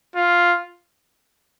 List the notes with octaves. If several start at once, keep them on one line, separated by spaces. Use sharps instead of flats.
F4